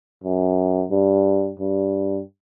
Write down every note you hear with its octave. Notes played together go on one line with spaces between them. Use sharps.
F#2
G2
G2